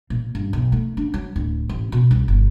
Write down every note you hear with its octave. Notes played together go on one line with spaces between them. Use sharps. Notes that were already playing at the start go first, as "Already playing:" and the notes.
A#2
G2
B1
A3
D4
F#3
D1
A1
B2
C2
G1